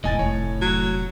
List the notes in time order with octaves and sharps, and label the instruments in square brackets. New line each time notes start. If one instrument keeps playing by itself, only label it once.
[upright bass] E1 [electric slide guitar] A2 [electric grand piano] D#5 G#5 A6
[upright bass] F1 [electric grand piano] C#5
[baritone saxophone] F#3